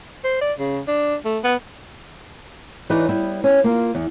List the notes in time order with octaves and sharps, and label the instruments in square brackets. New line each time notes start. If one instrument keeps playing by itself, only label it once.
[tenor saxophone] C5
D5
C#3
D4
A3
B3
[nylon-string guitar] E3 D#4 F#4 B4 C#5 D5
G3 B3 E4
B3 C#4
A#3 F4
E2